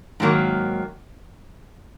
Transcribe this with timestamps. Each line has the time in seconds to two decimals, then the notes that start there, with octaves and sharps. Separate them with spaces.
0.20 G#2 D#3 F#3 A#3